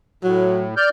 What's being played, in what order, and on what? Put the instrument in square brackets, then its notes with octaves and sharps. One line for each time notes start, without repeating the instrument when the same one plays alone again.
[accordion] A2 [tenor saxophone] F#3
[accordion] D5 F6 G6